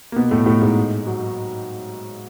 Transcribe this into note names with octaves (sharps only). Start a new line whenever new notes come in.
A#3
B2 B3
A2 A3
A2 A3
G#2 G#3
F#3